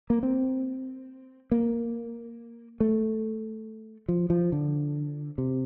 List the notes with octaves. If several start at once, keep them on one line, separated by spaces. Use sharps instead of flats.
A#3
C4
A#3
A3
F3
F3
D3
C3